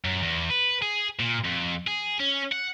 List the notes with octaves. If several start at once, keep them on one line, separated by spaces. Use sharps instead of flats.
F#2
E2
B4
G#4
A#2
F2
G#4
C#4
F#5